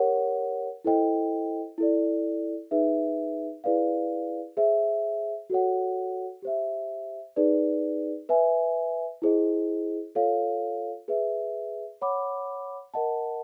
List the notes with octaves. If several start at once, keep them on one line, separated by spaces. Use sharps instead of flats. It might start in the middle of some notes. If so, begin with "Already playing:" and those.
Already playing: G4 A#4 C#5 F#5
E4 A4 C5 D#5 G5
E4 A4 D5
D#4 G#4 B4 E5
E4 G#4 B4 D5 F5
G#4 C5 E5
F#4 A4 C#5 F#5
G4 C5 E5
D#4 G#4 B4 D5
B4 E5 G#5
E4 G#4 C5 D#5
F4 A4 C#5 F5
G#4 B4 E5
C#5 F#5 B5 D6
A#4 D#5 F#5 A5